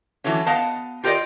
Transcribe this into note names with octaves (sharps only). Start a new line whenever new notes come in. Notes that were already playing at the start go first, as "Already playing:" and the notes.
E3 F#3 A3 C#4
B3 D#5 F5 F#5 A5
F4 G4 A#4 B4 D5 D#5